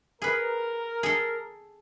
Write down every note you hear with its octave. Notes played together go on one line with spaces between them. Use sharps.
G#4 A#4 B4
G#4 A4